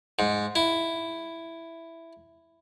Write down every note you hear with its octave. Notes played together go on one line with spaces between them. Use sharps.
G#2
E4